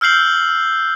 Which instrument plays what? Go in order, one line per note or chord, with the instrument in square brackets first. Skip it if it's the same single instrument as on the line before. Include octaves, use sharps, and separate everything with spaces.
[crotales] E6 F6 G6 C7 F#7